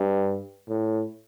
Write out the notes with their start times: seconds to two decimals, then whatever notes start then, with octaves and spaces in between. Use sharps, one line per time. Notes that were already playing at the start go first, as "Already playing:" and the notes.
Already playing: G2
0.69 A2